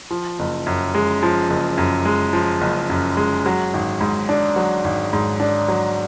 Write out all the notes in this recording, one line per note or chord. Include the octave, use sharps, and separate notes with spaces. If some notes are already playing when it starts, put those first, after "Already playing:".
F3
F#1
F#2
G#3
F3
F#1
F#2
G#3
F3
F#1
F#2
G#3
F#3
G#1
G#2
D4
F#3
G#1
G#2
D4
F#3